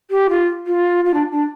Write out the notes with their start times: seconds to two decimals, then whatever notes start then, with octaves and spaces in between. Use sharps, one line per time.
0.10 G4
0.29 F4
0.66 F4
1.05 F4
1.14 D4
1.32 D4